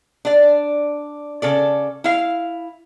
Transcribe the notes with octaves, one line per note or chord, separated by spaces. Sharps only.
D4 D5
C#3 A4 D5
E4 F5